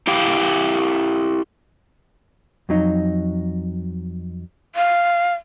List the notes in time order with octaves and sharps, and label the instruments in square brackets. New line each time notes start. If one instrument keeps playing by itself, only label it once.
[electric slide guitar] E4 G4 F5 G5
[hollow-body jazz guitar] F2 F#3 D#4
[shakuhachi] F5